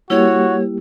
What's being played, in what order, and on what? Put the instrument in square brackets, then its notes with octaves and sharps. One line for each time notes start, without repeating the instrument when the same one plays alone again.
[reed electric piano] G3 A#3 G4 [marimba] E4 [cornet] F#4 [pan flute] C#5